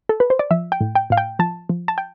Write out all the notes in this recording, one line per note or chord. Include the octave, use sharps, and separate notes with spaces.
A4
B4
C5
D5
F3 E5
G5
A2
G5
A2 F5
G5
F3 A5
F3
A5
G5